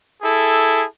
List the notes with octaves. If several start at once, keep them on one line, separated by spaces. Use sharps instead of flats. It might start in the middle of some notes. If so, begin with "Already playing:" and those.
E4 G#4 A4